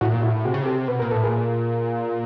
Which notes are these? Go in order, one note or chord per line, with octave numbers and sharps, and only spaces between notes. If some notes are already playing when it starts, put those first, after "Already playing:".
A2 E4 F#4
A#2
A2 E4 F#4
C3 F#4 G#4
C#3
C3 G4 A4
B2 B4
A#2 A#4
A2 A4
A#2 G#4 A#4